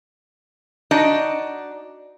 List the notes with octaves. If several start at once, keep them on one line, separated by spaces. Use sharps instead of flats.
D4 D#4 F#4 D#5